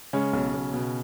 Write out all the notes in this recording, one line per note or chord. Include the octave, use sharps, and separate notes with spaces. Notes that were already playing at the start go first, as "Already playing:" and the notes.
C#3 G#3 C#4
B1
B1
B2